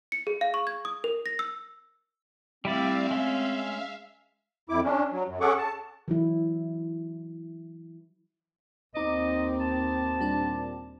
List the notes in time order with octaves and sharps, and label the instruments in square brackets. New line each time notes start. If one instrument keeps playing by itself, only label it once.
[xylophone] C#7
G#4
F5
C#6
G#6
D#6
A#4
A#6
E6
[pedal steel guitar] G3 E4 D5 [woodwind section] A3 C4 [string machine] E5 F5
[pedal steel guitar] G#3 C#4
[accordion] F2 E4 D6
C#4 D4
F#3
F#2
C#4 G#4 A4 F#5 C#6 D6
A5
[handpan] E3 F#3 E4
[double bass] D#2 C4 [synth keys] D#4 D6 [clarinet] D#5
[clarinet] A5
[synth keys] A#2 G3 D4